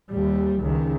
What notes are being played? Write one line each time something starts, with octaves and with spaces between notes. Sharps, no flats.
D#2 G3
C#2 D#3